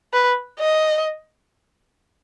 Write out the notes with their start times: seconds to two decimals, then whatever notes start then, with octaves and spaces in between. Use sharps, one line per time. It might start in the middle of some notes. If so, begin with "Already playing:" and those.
0.13 B4
0.60 D#5